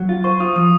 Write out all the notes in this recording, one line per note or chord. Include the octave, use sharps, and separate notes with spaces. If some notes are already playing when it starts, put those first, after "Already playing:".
Already playing: F#3
F4
C5 C#6
F4 D#6
F3 D#6